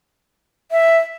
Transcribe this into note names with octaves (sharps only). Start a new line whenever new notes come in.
E5